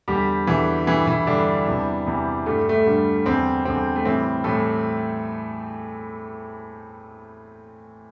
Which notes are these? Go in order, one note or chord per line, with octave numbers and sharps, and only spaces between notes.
E2 D3 G3 G4
E2 D3 E3 G3 E4
G2 D3 E3 G3 E4
E3 E4
G2 D3 G3 D4
E2 C3 E3 G3
E2 C3 E3 G3
G2 D3 G3 A3
A3
G2 D3 G3
E2 D3 G3 C4
E2 D3 G3 C4
A3
A2 E3 G3 C4
A2 E3 G3 A3 A4